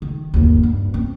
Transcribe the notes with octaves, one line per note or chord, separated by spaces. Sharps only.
D#3
G1 D#2
G2
C4